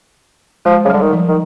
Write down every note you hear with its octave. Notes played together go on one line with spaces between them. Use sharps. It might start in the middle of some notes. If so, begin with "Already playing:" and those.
F3 G#3
C#3 F#3
D3 G3
D#3
F3
D#3